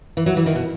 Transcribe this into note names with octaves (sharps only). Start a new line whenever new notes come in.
E3
F#3
E3
D#3
B2